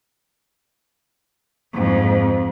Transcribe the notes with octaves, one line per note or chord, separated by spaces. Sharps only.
F2 G#2